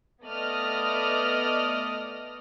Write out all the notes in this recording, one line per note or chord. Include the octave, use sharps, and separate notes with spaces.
A3 B3 D5 D#5 D#6 F6